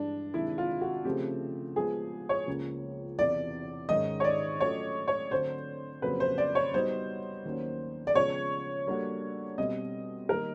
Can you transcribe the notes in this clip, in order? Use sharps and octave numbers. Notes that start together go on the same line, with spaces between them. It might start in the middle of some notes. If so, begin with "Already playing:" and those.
Already playing: G2 E3 G#3 D4
C3 D#3 G#3 E4
F4
F#4
C#3 F3 A3 C4 G4
F3 G#3 B3 G#4
C#5
C#2 C#3 F3 A#3 C#4
E2 C3 E3 D5
G#2 D#3 G#3 C#4 D#5
C#5
D5
F#3 A3 C#4 F4 A4 C#5
C#5
D3 F#3 A3 C4 C5
F2 C#3 F#3 A#3 B4
C5
D5
C#5
G3 B3 D#4 F#4 C5
D#2 D#3 F#3 A#3 C#4
D5
C#3 F3 G#3 B3 C#5
G3 A#3 D4 F#4 A4
B2 G3 C4 D#5
D#3 G3 A#3 D#4 A#4